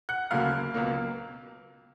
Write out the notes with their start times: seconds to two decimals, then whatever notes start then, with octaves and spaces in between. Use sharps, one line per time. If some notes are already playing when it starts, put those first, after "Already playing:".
0.09 F#5 F#6
0.31 E1 D2 C#3 F#3 A#3 F5 F6
0.74 C#2 B2 F#3 A#3